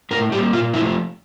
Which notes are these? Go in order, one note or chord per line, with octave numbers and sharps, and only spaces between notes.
A2 A#4
G3 A#3 G4
A#2 F4
F3 A3 E4